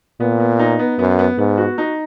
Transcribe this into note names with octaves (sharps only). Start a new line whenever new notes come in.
A#2 B3
B3
D#4
B3
F#2 B3
B3
G#2 B3
F#4
D#4